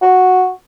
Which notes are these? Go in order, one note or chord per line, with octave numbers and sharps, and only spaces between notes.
F#4